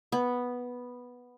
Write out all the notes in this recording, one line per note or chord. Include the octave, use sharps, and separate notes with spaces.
B3